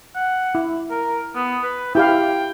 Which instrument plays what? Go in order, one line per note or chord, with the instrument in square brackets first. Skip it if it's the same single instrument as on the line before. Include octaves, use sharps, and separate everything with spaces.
[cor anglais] F#5
[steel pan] E4
[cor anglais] A#4
B3
B4
[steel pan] E4 G4 F5 [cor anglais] G5